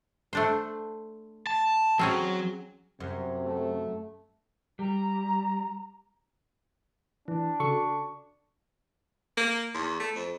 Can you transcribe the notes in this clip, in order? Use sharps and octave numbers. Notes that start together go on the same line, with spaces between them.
A3 D4 C5
A5
F#3 C4 C#4 G#4
F#2 C3
A3
G3 A#5
E3 D4
C#3 F#4 A4 C#6
A#3
E2
A3
F2